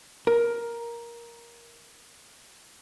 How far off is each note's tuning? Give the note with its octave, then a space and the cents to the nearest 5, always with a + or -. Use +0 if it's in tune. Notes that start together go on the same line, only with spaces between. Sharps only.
A#4 +10